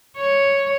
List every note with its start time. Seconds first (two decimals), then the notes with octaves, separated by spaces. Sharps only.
0.18 C#5